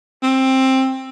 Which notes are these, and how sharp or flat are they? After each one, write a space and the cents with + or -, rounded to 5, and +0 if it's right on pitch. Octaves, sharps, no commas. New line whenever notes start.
C4 +15